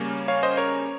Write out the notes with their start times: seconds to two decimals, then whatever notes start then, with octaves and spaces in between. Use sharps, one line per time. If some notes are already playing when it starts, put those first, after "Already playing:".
Already playing: C#3 G3 A#3 C#4
0.28 C#5 F5
0.43 C5 D#5
0.57 A#4 C#5